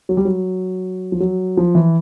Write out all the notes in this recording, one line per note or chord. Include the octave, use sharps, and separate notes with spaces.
F#3
G3
F#3
F3
F#3
F3
E3